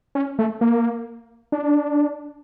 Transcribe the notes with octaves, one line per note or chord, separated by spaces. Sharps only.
C#4
A3
A#3
D4